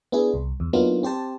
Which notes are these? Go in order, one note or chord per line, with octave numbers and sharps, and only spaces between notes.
B3 D4 E4 G#4
C2
E2
F#3 A#3 B3 D4 D#4 F4
C4 G4 C5 A5